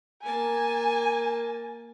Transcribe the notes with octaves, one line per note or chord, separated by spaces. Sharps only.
A#3 G#5 A5